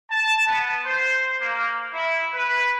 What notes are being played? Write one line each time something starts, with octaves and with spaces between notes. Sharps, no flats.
A5
B3
C5
A#3
E4
B4